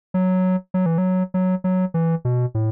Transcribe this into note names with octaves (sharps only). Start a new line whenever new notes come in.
F#3
F#3
E3
F#3
F#3
F#3
E3
B2
A2